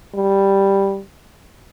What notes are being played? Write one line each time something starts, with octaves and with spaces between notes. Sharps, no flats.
G3